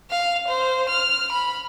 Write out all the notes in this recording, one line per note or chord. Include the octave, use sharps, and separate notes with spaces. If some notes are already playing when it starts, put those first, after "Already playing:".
F5
C5
F6
B5